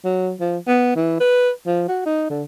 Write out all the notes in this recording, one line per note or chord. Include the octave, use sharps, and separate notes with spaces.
F#3
F3
B3
E3
B4
F3
F#4
D#4
D3